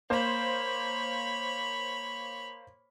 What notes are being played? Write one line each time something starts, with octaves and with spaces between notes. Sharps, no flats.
A#3 C5 C#5 B5